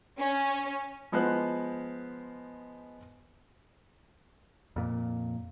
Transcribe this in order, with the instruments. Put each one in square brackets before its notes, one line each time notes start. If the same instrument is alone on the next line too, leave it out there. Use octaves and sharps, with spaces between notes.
[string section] C#4
[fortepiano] F3 G#3 B3 C5 F#6
[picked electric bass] F2 A#2